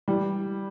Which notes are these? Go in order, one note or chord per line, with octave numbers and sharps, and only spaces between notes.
E3 G3